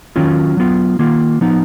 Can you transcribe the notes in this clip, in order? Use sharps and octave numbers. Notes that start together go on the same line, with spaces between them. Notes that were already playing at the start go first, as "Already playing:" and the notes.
D#3 F#3 C#4 F4
F#3 B3 F4
D#3 A#3 F4
F3 B3 D#4